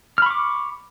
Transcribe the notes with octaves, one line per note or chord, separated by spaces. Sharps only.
B5 C#6 D6 F6